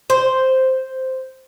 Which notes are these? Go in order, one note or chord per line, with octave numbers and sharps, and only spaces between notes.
C5